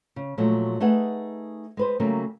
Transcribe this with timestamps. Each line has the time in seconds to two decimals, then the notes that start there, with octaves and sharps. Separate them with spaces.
0.16 C#3
0.38 A#2 F3 F#3 G#3 A3
0.80 A3 D#4 G#4 B4 E5 F#5
1.77 G#3 B4 C5
2.00 C#3 F#3 G3 A3 A#3